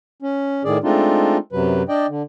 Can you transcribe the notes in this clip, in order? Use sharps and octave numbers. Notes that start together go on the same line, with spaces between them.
C#4
A2 D#3 G#4 D5
G#3 A3 C4 D4 D#4 F4
F#2 C3 F#3 B4
D4 D5 D#5 G5
D3